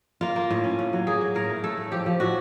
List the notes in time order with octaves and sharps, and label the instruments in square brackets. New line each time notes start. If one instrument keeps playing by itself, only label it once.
[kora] A#3 F4
A#3
A2
C#4
A2
F#3
A#3 G#4
F#3
A2 A#4
A3
A3 A4
A2
F3 G4
F3
A2 F#4